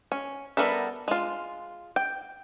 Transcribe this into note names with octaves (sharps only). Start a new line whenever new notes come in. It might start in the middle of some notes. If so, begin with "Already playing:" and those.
C#4
G3 B3 A4 A#4 E5
G#3 F4
G5